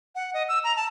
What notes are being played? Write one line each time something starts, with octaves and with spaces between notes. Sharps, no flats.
F#5
D#5
E6
A#5
A5